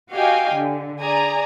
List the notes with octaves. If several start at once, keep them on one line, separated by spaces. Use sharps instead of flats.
F#4 G4 D#5 F5 G5 G#5
D3
G#4 D5 G#5 A#5